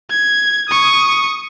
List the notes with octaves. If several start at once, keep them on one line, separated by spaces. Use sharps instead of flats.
G#6
C#6 D#6